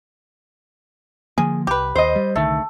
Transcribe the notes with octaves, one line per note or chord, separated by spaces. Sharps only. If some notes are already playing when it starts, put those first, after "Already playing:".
D3 F3 A#3 G#4
C2 G4 B4
D#2 C5 D#5
G3
C2 D3 D#3 A3